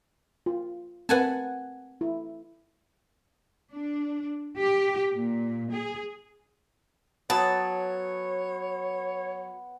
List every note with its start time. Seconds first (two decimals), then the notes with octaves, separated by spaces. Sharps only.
0.46 F4
1.09 C4 A#4 B4 F#5 G#5 A5
2.01 E4
3.72 D4
4.58 G4
5.13 A#2
5.72 G#4
7.30 F#3 B3 C#5 A5